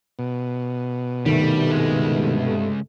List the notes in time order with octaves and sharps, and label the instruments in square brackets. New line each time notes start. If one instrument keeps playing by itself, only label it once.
[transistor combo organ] B2
[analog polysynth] G2 C3 A3 [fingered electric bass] D#3 [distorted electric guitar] G3
[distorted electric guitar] C#2 G#3